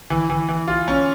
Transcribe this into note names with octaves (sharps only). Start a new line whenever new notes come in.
E3
E3
E3
F4
C#4